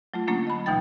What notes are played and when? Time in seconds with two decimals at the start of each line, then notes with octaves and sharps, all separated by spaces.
0.14 F#3 A3 F4
0.28 D3 F#3 A3 A#3 C#4 D4
0.47 D#5 B5
0.66 D2 B2 E3 D#4 G5 A6